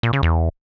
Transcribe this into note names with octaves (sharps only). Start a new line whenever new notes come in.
A#2
C#3
E2